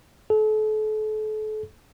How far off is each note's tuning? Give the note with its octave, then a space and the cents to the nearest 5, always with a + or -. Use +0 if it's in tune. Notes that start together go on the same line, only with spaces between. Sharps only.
A4 -35